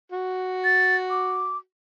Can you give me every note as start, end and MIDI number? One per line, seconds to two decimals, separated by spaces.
0.12 1.60 66
0.64 0.96 93
1.10 1.57 86